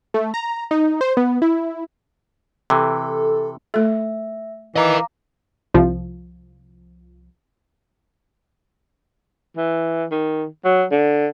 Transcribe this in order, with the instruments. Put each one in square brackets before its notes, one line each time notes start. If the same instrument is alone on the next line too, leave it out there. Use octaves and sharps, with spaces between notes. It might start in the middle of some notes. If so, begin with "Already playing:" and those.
[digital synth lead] A3
A#5
D#4
C5
B3
E4
[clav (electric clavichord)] C3 E3 [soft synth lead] A4
[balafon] A3 A4 [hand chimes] E5
[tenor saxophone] E3 [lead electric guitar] A#4 D#5 [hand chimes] F5 A#5 D6
[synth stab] C2 F3
[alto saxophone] E3
D#3
F#3
D3